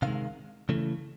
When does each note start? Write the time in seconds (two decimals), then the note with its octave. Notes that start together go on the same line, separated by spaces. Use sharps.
0.02 C3 D#3 G#3 F5
0.69 C#3 E3 A3